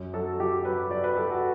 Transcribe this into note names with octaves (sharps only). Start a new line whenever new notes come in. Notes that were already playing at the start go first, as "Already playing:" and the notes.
Already playing: F#2
F#3 A4
F#3 G4
F#3 B4
F#3 D5
B4
F#3 A4
F#4